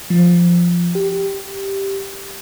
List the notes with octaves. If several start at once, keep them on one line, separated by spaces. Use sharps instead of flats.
F3
G4